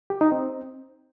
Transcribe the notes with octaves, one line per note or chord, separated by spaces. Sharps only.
G4
D#4
C4